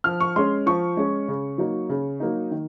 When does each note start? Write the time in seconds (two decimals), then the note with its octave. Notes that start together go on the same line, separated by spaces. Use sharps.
0.04 F3 F6
0.20 C#6
0.36 G#3 C#4 C6
0.66 F3 C#6
0.97 G#3 C#4
1.28 C#3
1.58 F#3 A#3 D#4
1.89 C#3
2.20 F#3 A#3 D#4
2.51 D#3